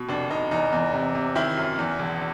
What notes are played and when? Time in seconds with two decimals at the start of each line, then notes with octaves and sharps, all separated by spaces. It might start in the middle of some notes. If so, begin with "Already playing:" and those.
Already playing: B2
0.09 F1 D4
0.30 F1 D#4
0.51 E2 D#4
0.72 E2
0.94 C3
1.15 C3
1.35 D#3 E4
1.57 F#2
1.79 E2
1.99 E1